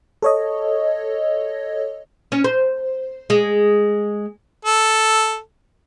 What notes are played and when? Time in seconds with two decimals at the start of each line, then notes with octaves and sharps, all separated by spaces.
0.22 A4 C#5 D#5
2.32 C#4
2.44 C5
3.30 G#3
4.65 A4